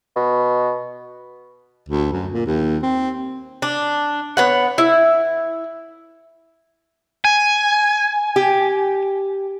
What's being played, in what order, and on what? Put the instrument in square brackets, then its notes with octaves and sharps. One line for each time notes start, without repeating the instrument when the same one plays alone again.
[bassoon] B2
[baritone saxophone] D2
F#2
A#2
D#2
C4
[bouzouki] D4
B3 C#5 F#5
E4
[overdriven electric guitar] G#5
[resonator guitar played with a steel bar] G4